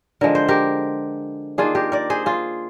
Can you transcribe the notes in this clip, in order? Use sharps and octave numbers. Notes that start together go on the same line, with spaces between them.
D3 F3 G#3 A#4
C5
G4 A#4
D#3 A#3 D4 F4 G#4
G4 A#4
A#4 D5
G#4 C5
F4 G#4